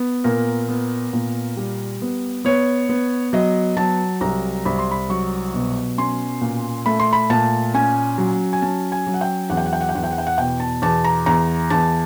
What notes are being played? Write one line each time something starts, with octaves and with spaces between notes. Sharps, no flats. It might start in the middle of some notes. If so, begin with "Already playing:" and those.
Already playing: B3
A#2 A#4
B3
A#2
G3
B3
B3 C#5
B3
F#3 D#5
F#3 A5
C2 A#5
C2 B5
C6
B5
F#3 C#6
B2
C#4 C6
A#2
A3 B5
C6
B5
A#2 A5
C#4 G#5
F#3
G#5
C#4 A5
G#5
F#3
F#5
G5
E2 F#5
G5
F#5
G5
F#5
G5
E2 F#5
G5
F#5
G5
F#5
B2 G5
A5
E2 A5
A#5
E2 A#5
E2 A5